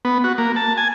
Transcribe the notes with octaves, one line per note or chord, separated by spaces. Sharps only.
B3
F#4
A#3
A5
G#5